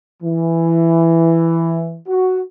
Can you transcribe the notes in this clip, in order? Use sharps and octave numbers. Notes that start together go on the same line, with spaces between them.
E3
F#4